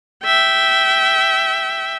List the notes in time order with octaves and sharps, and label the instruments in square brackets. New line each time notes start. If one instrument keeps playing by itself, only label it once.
[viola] E5 G5